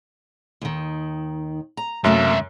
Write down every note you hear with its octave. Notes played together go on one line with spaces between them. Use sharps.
D#2 D#3
A#5
C#2 F#2 C3 A3 A#3 E5